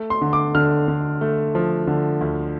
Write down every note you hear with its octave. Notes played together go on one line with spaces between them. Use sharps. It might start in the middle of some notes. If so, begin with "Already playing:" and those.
Already playing: A3
C6
D3
D6
D3 F6
D3
A3
F3
D3
D2